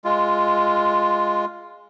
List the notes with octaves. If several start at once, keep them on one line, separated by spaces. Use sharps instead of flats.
G#3 F4